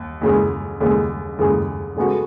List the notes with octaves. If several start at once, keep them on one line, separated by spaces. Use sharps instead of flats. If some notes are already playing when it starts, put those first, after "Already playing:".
Already playing: D#2
D#2 C#3 G#3
D#2 C#3 G#3
D#2 C#3 G#3
C#3 G#3 B3 F#4 A4